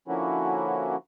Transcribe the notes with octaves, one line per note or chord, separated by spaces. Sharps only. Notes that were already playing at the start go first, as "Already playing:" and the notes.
D3 F3 A#3 C#4 E4 F#4